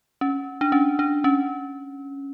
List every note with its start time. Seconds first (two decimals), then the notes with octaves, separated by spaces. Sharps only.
0.21 C#4
0.61 D4
0.72 C#4
0.99 D4
1.24 C#4